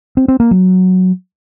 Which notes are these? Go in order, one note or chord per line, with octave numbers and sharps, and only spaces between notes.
C4
C4
A#3
F#3